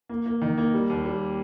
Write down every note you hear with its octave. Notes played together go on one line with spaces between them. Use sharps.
A#3
A#3
D#3
A#3
G3
D#2
G3